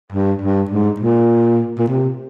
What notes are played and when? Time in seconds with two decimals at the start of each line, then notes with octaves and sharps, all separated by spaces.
0.12 G2
0.42 G2
0.71 G#2
1.00 A#2
1.79 A#2
1.88 C3